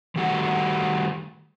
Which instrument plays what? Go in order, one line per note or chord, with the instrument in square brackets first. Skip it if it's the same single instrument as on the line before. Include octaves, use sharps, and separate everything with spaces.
[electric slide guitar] D#3 G3 A3 F#4 F#5